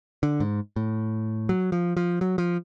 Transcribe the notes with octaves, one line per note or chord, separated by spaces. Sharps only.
D3
G#2
A2
F#3
F3
F3
F#3
F3